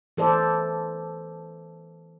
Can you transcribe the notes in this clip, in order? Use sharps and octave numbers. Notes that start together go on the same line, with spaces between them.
E3 A4 C5 D5